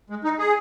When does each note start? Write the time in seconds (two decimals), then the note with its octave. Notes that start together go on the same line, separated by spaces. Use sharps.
0.10 G#3
0.24 D#4
0.39 G#4